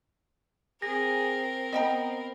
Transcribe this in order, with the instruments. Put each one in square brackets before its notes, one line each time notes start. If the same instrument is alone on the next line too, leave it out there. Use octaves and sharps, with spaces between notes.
[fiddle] C4 A#4 [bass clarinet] G#4 [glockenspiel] A#6
[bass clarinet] B3 [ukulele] D#5 G5 A#5